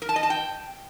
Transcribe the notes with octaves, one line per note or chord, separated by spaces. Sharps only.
A#4
A5
D#5
A5
G5